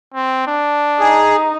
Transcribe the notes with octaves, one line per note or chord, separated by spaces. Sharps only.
C4
D4
D#4 G#4